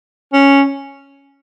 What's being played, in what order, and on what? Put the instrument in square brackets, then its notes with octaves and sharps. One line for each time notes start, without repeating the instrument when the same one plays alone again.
[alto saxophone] C#4